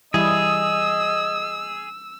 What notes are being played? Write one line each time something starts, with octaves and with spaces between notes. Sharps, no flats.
E3 G3 E4 G#4 D#5 E6